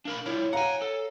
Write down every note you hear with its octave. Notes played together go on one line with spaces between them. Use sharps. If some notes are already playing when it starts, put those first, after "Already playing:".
D4 A#4 F5 B5
G3 E4 F4 C#5
F5 F#5 G#5 A#5
A4